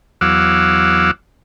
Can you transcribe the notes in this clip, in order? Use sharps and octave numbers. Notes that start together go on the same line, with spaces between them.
E2 F#3 F5 F#5 D6 E6